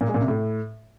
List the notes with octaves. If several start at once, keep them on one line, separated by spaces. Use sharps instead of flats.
A#2
G#3
A#2
C3
A2